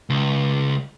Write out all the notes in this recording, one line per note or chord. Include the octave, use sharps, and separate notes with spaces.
C#2